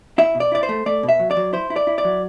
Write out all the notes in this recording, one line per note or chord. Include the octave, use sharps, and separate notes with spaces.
E4 E5
B2
D5
E4 D5
C5
A3
A3 D5
B2
E5
F#3
D5
F#3
E4 C5
E4
D5
E4
D5
F#3